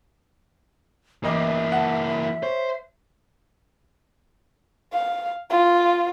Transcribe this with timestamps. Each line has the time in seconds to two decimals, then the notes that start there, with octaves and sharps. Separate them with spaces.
1.24 A1 E3 A#3 D#5 E5 D6
1.72 F#5 A5
2.43 C5 C#5
4.93 F5
5.50 F4